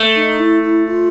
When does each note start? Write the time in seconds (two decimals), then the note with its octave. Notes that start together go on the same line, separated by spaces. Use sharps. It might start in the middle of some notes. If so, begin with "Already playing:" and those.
Already playing: A3
0.16 D#4
0.39 E4
0.63 E4
0.86 F4